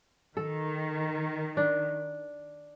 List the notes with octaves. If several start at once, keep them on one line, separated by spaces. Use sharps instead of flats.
D#3 A4
D4